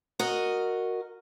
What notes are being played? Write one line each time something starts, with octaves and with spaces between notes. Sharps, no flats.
F#4 A#4 D#5